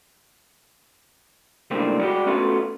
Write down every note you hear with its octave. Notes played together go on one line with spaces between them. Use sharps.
C#2 A2 D3 G3 A#3 C4
G3 G#3 F#4 G4
A3 B3 C#4 F4 F#4 A4